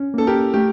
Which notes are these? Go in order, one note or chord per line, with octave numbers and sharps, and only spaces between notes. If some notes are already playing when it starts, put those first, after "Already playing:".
Already playing: C#4
A#3 A4
G4 A#4
A3 G4